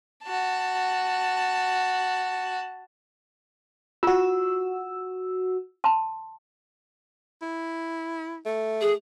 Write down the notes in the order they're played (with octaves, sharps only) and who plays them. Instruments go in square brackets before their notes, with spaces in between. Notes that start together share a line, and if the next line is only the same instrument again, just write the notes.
[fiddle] F#4 A5
[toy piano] F4 [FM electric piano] F#4 E6
[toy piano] A5 C6
[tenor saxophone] E4
A3
[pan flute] G#4